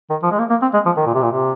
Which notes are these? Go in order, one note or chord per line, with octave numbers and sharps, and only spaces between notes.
D#3
F3
G#3
A#3
A#3
C4
G#3
F3
D#3
A#2
C3
A#2
C3